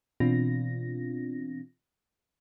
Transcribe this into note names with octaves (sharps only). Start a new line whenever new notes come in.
B2 E3 C4 D4 F4 A#6